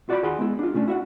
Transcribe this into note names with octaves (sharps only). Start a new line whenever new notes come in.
F4 F#4 D5 E5 G5 B5
D#2 G#4 F#5 B5 C6
G#3 B3 E4
D4 F4
C2 A3 C#4 D4
E4 F#4 E5 F#5